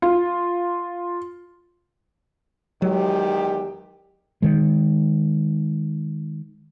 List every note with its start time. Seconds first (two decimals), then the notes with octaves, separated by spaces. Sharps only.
0.02 F4
2.82 E2 D#3 F#3 G#3 G4
4.42 D#3 G#3